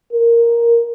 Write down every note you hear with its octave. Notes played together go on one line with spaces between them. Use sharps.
A#4